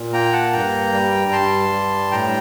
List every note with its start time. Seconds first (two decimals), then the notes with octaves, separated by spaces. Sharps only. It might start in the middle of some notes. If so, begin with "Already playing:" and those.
Already playing: A#2
0.13 A#3 G5 A#5
0.33 F#5 A5
0.52 G2 G5 A#5
0.93 G3
1.32 G2 A5 C6
1.71 G3
2.11 A2 G5 A#5